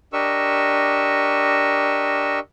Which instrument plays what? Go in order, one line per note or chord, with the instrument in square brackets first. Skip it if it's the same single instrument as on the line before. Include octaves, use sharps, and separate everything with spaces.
[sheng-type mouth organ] D4 G4 A#4 D#5 C#6 E6